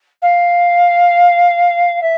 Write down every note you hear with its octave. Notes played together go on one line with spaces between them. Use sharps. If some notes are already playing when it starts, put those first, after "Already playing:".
F5
E5